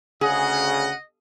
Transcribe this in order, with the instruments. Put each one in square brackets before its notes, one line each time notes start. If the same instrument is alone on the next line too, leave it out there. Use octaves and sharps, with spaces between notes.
[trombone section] D2 C#3 [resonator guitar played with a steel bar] G#4 [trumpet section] D#5 [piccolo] F#5